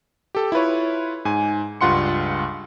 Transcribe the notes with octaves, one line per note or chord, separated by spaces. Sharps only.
G4 A4
E4 F4 B4 C#5
G#2 G#5
C#2 G2 F4 F#5 C6 C#7